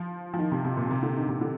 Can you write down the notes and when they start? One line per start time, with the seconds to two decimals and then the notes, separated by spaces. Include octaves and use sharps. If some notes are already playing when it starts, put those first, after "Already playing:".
Already playing: F3
0.34 F3
0.39 D#3
0.52 C3
0.65 C3
0.77 A#2
0.91 C3
1.03 D3
1.16 D#3
1.28 C3
1.41 D3